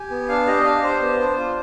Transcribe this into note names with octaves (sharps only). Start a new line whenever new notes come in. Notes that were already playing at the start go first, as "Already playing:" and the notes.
Already playing: G4 G#5
B3
D4 F5
G4 D#5
D4 F5
G4 C5
B3
D4
F4